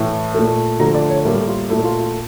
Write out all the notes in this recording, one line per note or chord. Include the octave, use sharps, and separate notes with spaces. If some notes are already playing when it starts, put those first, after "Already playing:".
Already playing: A2 E3 A3
A#2 A3
D3 F3 A3 A#5
D5
C#5
A2 G3 A#3 A#4
A4
F4
A#2 A3 E4
F4
F4